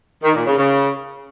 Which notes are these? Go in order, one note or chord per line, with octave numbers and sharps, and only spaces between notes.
D#3
A#2
C#3
C#3